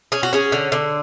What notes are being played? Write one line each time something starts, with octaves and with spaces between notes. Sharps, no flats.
C#4 G#4
F#4
C#4 G#4
D3
D3